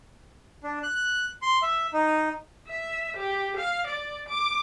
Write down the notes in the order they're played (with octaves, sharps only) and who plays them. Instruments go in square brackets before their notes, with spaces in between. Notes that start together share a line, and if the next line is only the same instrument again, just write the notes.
[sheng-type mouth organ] D4
F#6
C6
E5
D#4
[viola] E5
G4
F5
D5
D6